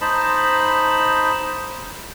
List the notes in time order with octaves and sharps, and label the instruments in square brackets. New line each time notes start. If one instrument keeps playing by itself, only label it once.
[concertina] D#4 C5 A5 B5